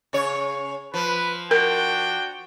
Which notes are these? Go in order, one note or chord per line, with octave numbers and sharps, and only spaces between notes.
C#3 C#5
F3 B4
D4 F#4 A#4 G5